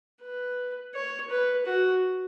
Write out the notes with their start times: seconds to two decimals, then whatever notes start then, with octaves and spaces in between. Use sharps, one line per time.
0.22 B4
0.94 C#5
1.30 B4
1.66 F#4